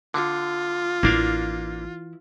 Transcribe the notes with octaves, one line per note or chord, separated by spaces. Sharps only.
D3 F4
A1 E3 A#3 D4 E4 F5